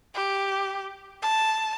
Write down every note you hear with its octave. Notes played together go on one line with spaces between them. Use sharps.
G4
A5